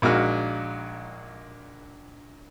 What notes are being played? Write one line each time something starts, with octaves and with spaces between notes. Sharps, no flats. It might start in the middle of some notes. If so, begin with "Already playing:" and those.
A#1 A#2 G#3 D#4 F#4 F6